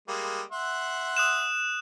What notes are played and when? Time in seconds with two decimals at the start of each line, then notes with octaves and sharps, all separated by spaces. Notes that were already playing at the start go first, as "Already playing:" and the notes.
0.08 G3 G#3 A#3
0.52 E5 F#5 C6
1.17 D#6 F#6 E7